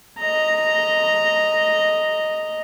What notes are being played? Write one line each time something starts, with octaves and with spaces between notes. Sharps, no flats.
D#5 A#5